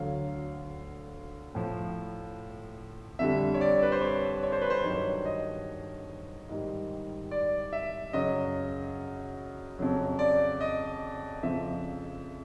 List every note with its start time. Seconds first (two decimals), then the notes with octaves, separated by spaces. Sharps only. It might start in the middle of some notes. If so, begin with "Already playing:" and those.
Already playing: D2 D3 F#3 F5
1.55 A2 F3
3.19 F2 D3 G3 E5
3.54 C#5
3.61 D5
3.83 B4
3.92 C5
4.01 C#5
4.43 C#5
4.52 C5
4.62 B4
4.70 C5
4.84 G2 D#3 F#3 C#5
5.25 D#5
6.49 G#2 D#3 G3
7.31 D5
7.73 E5
8.13 F#2 C#3 F#3 D#5
9.78 F2 C#3 F#3
10.19 D5
10.61 D#5
11.43 F2 C#3 F3 E5